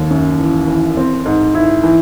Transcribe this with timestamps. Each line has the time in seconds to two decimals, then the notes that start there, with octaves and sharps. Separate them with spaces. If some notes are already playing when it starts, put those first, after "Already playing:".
Already playing: D#2
0.10 F#2
0.39 E3
0.68 E3
0.97 C4
1.26 G#2
1.55 E4
1.84 E3